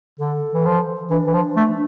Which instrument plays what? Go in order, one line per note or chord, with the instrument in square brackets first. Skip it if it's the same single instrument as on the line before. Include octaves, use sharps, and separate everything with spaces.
[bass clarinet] D3 [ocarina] A4
[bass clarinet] E3
F3
[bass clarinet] E3 [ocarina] D4
[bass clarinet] E3
F3
A3